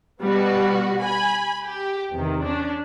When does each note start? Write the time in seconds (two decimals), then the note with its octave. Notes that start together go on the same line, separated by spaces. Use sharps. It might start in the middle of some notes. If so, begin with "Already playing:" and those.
0.22 B2 G3 B3 F#4
1.02 G#5 B5
1.65 G4
2.13 E2 C3 D#3
2.42 C#4 D4